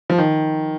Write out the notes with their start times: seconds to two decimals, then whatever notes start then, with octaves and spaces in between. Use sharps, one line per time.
0.10 F3
0.18 D#3